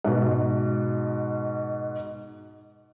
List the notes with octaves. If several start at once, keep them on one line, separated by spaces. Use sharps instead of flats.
G#2 B2